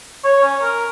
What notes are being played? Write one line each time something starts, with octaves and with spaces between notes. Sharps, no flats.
C#5
C#4
A#4